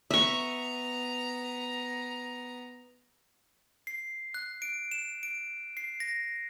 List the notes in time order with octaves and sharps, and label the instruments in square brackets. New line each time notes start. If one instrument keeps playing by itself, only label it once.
[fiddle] B3 A#5 [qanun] E5 C#6
[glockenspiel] C7
F#6
D7
E7
D7
C7
A#6